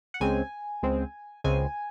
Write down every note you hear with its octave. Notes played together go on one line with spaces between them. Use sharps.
F#5
C#2 C#3 G#3 C4 G#5
C#2 C#3 G#3 C4
C#2 C#3 G#3 C4 G#5